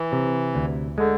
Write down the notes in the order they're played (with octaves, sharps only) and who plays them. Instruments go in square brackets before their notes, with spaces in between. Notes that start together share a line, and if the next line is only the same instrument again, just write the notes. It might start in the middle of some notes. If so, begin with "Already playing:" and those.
Already playing: [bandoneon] E3
[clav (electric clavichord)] C3
D2
[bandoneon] D3 [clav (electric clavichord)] G#3